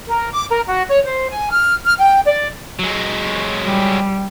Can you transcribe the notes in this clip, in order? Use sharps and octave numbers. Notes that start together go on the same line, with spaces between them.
A#4
D6
A#4
F#4
C#5
C5
G#5
F6
F6
G5
D5
F#3 G#3
G3